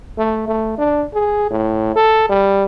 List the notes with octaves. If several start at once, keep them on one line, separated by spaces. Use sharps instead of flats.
A3
A3
D4
G#4
A2
A4
G3